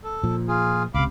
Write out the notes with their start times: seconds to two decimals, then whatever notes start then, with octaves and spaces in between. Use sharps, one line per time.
0.04 A4
0.24 A#2 F3
0.48 F4 G#4
0.94 C#2 C3 F5 B5 D6